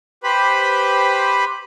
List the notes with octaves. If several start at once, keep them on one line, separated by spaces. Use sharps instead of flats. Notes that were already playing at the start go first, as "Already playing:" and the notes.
G4 B4 C5 B5